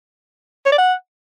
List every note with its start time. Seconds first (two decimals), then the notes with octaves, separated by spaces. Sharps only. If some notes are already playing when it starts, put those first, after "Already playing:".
0.66 C#5
0.72 D5
0.78 F#5